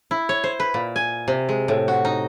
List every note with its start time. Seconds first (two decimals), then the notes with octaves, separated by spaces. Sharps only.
0.11 E4
0.29 C#5
0.44 C5
0.60 B4
0.74 A#2
0.96 G#5
1.28 C3
1.49 G#3
1.68 A2
1.88 F#4
2.05 D#4